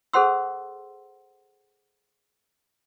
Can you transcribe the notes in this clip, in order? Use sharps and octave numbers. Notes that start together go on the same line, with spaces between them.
G#4 A4 C5 F#5 C6 E6